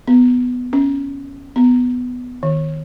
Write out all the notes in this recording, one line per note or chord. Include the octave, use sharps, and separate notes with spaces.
B3
C#4
B3
D#3